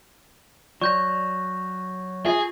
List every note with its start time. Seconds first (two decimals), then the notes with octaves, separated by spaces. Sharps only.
0.81 F#3 D5 C6 C#6 G6 A#6
2.26 F4 G#4 E5